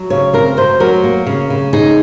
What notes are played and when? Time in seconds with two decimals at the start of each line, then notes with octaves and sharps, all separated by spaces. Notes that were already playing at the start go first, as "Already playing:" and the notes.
Already playing: F#3
0.10 C#3 C#5
0.33 C4 A#4
0.57 F#2 C5
0.80 F#3 A#4
1.04 A#3
1.27 C#3
1.50 C#3
1.73 D#4 G#4